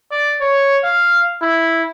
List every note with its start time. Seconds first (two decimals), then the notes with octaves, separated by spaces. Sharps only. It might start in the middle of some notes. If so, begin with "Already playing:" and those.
0.12 D5
0.41 C#5
0.84 F5
1.42 E4